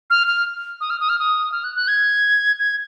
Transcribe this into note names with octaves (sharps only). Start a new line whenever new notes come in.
F6
F6
D#6
F6
D#6
F6
D#6
F6
F#6
F#6
G#6
G#6